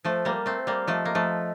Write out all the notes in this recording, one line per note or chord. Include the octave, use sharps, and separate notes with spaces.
F3 A3 C5
G3 A#3
A#4
A3 C4
C5
G3 A#3
F3 A3 D#5
A#3
F3 A3